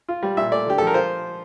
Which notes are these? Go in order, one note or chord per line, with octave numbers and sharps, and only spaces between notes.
F4
G3
A#2 E5
A3 D5
D3 G4
F3 A4
A#4
F4 C5